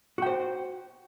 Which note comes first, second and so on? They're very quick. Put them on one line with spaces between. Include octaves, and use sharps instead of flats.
F#4 G5 C5